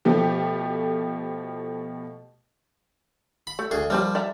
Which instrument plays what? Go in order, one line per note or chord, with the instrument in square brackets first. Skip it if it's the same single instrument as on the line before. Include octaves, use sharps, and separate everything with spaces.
[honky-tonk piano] B2 F3 A3 G4
[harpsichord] B5
[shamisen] A3
[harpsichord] D2 G#4
[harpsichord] F3 G3 [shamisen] A#4 C5 F5
[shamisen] D5 E5 A#5